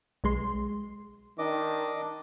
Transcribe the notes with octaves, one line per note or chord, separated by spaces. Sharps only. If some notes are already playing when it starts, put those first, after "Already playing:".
B1 G#3 C6
D#3 D4 D#5 D6